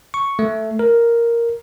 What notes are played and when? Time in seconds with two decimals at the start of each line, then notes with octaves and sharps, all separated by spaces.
0.14 C#6
0.39 A3
0.79 A#4